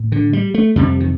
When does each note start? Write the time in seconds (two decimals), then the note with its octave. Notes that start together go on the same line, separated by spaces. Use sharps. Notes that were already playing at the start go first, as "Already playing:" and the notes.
Already playing: A2
0.12 D3
0.33 G3
0.54 A3
0.76 F2 C3 G3
1.00 D#3